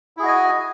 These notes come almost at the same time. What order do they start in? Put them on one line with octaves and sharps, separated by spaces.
E4 G#4 F#4 D#5 G#5